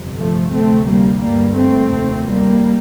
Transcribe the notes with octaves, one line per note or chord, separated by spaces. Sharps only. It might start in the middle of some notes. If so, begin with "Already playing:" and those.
Already playing: G1 F2 C3
F3 A3
D2 C3 A3 C4
G3 A#3
G1 G2 G3 A#3
A3 C4
F1 D#2
G3 A#3